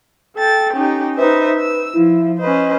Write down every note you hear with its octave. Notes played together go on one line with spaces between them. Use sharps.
A4 G5 A6
C#4 D#4 G4
D#4 B4 C5 E5
E6
F3 E4
C#4 B4 C5 D#5